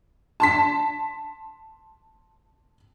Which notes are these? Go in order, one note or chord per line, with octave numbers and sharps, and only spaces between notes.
A5 C6 B6